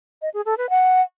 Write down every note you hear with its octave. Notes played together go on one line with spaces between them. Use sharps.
D#5
G#4
A4
B4
F#5